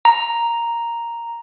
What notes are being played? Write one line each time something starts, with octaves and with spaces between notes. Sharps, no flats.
A#5